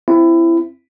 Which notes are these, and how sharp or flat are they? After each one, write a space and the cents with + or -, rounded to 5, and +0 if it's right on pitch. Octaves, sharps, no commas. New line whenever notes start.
C4 +0 E4 +20